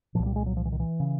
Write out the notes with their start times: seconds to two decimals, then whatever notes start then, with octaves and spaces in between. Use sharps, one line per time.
0.15 A#2 F3
0.19 C2
0.26 G3
0.36 G#3
0.46 F#3
0.57 F3
0.65 E3
0.72 D#3
0.80 E3
1.00 C#3